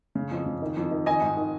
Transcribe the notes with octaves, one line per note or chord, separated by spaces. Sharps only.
C#3
F2
C#3
D#3
F2
D#3
D#3 D#5 G#5
G#2
D#3